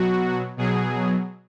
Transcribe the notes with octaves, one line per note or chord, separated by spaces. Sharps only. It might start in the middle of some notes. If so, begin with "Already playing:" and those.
Already playing: B2 F#3 F#4
B2 F#3 G#4